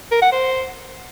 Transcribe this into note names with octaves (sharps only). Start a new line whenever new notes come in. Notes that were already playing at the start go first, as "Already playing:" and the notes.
A#4
F#5
C5